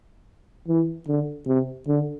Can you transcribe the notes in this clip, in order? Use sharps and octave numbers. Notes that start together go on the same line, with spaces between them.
E3
D3
C3
D3